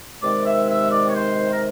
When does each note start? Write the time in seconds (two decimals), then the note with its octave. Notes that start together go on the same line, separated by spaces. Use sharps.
0.23 C3 D#3 G#3 D5
0.46 E5
0.69 E5
0.91 D5
1.08 C#5
1.15 C5
1.52 A#4